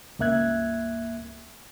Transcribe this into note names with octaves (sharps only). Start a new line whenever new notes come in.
C#2 G2 A#3 E5 F#6 G#6